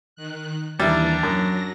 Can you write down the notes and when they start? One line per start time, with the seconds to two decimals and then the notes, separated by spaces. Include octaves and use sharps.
0.16 D#3 F#6
0.79 D#2 E3 G3 D4 E4 A#5
1.23 F#2 F#3 A#6